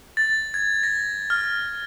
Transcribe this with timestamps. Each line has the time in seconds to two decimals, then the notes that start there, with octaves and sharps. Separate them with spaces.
0.17 A6
0.54 G#6
0.83 A#6
1.30 F6